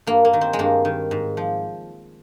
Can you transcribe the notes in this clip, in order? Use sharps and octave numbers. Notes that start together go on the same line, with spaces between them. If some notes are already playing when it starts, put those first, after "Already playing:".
G2 A#3
A#3
D#3
C4
G#3
G2 A#3
D#3
G#2
F3